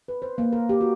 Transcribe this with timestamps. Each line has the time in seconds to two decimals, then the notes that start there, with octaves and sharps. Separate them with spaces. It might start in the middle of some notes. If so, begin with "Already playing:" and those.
0.08 B4
0.22 C5
0.38 A#3
0.53 A#4
0.69 G4
0.81 F#4